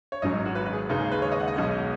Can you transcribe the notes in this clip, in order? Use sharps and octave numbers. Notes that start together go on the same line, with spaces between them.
C#5
G#1 G#2 F#3 C#4 D#5
F#4
B4
B4
G#4
D#2 C#3 G#3 D#4
G#4
B4
C#5
D#5
F#5
D#5
B1 B2 G#3 C#4